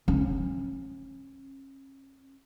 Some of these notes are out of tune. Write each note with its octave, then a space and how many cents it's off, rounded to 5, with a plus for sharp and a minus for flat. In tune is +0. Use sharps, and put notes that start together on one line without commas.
C#4 -35